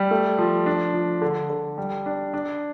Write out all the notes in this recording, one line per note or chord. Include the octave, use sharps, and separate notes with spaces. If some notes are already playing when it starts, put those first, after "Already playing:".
Already playing: G3
A3
F3
D4
F3
D3
D3
G3
D4
D4